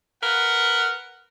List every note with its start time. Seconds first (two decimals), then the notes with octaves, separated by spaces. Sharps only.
0.22 A#4 B4 F#5